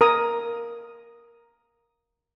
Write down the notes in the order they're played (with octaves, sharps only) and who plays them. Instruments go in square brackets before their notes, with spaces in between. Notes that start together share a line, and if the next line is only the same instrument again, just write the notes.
[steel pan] A#4 A#5 D#6